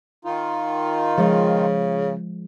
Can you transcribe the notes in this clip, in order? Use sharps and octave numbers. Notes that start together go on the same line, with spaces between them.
D#3 D#4 F4
C#3 F3 G#3